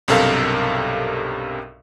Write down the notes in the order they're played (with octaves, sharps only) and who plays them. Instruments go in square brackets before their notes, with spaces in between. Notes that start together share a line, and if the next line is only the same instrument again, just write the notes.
[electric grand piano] B1 G2 C3 A4 A#4 F5